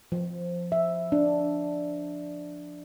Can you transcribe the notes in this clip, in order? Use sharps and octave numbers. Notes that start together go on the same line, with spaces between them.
F3
E5
D4